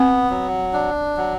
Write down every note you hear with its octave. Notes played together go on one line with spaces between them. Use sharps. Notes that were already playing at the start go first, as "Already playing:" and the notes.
Already playing: B3 C4
F#3
D4
F#3